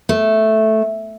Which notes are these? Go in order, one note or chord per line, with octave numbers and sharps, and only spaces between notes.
A3